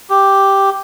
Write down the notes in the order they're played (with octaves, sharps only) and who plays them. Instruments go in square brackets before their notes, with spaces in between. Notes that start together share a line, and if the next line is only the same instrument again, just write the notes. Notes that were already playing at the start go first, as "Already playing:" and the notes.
[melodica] G4